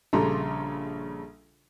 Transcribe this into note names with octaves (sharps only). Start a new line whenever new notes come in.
A#1 C#3 G3 A4 A#5 C6